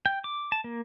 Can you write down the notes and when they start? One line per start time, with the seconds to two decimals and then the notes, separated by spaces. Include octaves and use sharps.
0.06 G5
0.24 D6
0.52 A5
0.64 A#3